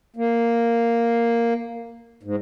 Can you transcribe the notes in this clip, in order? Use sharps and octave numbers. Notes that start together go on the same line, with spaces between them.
A#3
G#2